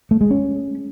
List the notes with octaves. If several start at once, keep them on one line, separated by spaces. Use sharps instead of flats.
A3
G#3
C#4